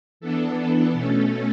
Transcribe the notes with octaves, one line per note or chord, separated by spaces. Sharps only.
E3 B3 D4 A4
B2 A3 C#4 A4